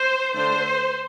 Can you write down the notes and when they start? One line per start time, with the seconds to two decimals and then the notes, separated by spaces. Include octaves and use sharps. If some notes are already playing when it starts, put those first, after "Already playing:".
Already playing: C5
0.33 D3 A3 D4 C5